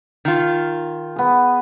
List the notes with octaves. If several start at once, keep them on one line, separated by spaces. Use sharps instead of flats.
D#3 F4
B3 G#4